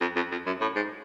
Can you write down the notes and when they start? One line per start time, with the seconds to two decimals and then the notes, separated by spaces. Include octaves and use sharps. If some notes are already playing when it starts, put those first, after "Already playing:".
0.01 F2
0.16 F2
0.31 F2
0.46 F#2
0.61 A2
0.76 G#2